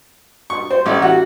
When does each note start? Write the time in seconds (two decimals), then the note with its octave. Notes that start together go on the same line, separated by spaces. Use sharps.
0.50 C#6
0.70 C5
0.86 A1
1.02 F#4